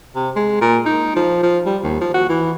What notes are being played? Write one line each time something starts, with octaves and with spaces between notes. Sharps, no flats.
C3
G#3
A#2
D#4
F3
F3
G3
D#2
F3
F#4
E3